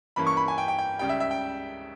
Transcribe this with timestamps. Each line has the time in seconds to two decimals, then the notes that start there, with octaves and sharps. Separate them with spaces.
0.16 G2 E3 A#3 C#4 B5
0.27 C#6
0.37 B5
0.48 G#5
0.58 G5
0.68 G5
0.78 G5
0.99 C#2 C#3 G3 G5
1.09 E5
1.20 E5
1.31 G5